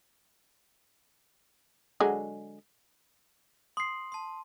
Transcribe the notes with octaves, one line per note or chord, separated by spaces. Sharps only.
D3 F#3 G#3
C6 D#6 C7
A5 C6